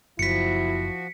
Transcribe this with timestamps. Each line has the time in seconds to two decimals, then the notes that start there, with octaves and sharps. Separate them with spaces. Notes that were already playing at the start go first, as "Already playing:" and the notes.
0.19 F#1 F3 E4 F#4 B6 C#7